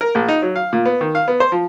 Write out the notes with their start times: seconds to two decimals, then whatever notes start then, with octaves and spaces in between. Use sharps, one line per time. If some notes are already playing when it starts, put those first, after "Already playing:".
0.01 A#4
0.15 A#1
0.28 D#4
0.42 F#3
0.56 F5
0.73 A#2
0.86 B3
1.01 D#3
1.15 F5
1.28 B3
1.40 C5
1.52 F3